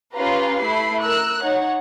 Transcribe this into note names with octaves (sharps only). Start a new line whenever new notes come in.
C#4 F4 G4 B4 F5 A#5
A3 E4 B5 C7
A#4 E6 F#6
D#4 C#5 F#5